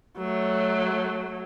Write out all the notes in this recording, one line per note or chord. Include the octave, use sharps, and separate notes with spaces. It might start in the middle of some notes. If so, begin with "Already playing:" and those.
F#3 A3